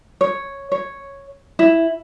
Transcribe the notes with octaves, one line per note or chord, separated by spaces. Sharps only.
C#5
C#5
E4